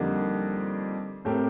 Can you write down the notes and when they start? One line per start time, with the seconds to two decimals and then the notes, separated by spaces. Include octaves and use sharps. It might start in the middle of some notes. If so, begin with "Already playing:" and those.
Already playing: F2 D3 G3 A#3 D#4
1.25 A2 A3 C4 G4 A#4